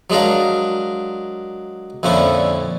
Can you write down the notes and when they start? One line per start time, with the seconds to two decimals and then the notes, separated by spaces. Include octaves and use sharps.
0.10 F#3 G#3 D4 A#4 F5
2.03 F2 A#2 D3 C#4 E4